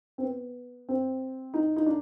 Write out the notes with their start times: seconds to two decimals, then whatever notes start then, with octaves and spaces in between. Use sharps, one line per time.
0.18 C4
0.23 B3
0.89 C4
1.54 D#4
1.76 D#4
1.86 D4